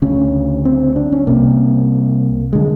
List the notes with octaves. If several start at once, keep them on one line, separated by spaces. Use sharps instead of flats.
D2 C#3 C#4
C4
D4
C#4
C2 C3 A#3
D3 G#3